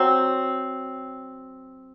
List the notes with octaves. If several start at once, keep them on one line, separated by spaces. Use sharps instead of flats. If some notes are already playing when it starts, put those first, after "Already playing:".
Already playing: F#3 C4